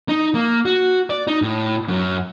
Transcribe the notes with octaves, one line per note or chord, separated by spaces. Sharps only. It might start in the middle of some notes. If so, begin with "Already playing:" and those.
D#4
A#3
F#4
D5
D#4
A2
F#2